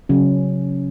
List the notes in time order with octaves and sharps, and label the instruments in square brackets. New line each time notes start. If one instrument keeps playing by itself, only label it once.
[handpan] C#3 F#3 C#4